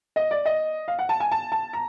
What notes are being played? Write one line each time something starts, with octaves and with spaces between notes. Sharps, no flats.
D#5
D5
D#5
F5
F#5
A5
G#5
A5
A5
A#5